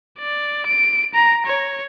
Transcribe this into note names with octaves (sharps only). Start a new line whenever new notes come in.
D5
D7
A#5
C#5